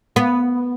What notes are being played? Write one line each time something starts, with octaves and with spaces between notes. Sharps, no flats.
B3